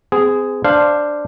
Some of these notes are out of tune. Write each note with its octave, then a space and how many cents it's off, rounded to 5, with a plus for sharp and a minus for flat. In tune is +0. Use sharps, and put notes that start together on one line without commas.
C4 -35 G#4 +0
D4 +0 C5 +0 F5 -10